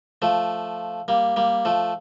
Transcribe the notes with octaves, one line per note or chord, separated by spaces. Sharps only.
F3 A3
G3 A#3
G3 A#3
F3 A3